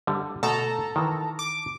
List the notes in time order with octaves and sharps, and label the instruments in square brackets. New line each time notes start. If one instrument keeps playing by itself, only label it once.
[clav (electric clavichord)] D3 G3
[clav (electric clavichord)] B2 A3 [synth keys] A4 A5 A#5
[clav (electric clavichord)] D#3 E3
[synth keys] D6